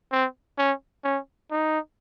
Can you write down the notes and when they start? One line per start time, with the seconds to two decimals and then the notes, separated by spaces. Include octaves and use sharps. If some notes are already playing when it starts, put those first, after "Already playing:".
0.12 C4
0.58 C#4
1.04 C#4
1.51 D#4